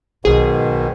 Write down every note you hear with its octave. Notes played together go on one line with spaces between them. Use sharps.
B1 G#2 B2 D#3 G#4